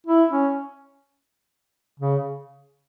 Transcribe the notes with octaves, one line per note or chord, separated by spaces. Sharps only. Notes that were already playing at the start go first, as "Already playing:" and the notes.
E4
C#4
C#3